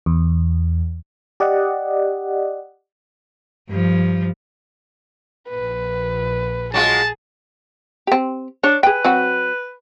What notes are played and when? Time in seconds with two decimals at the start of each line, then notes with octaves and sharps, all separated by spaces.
0.06 E2
1.40 G4 D5 D#5 F#5
3.69 G2 F3
5.49 A#1 A#2 B4
6.74 F#3 G#3 F4 G#4 A5
8.07 C4 G4
8.64 D4 C#5
8.83 G#4 B4 G5
9.05 F#3 C4 F#4